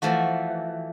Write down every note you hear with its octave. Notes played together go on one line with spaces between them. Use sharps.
E3 F3 A3 F#4